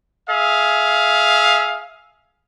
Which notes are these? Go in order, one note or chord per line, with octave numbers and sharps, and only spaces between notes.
G#4 E5 F5